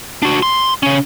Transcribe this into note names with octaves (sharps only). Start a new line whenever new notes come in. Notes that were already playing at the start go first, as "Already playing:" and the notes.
D4 F#4
C6
C#3 C#4